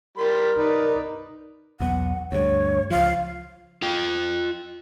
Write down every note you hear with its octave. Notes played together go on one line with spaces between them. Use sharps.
G3 A#4 B5 C6
D#4 B4 D5
B1 E2 B3 F#5
D2 G2 C#5
C#2 F3 F5
F4 G5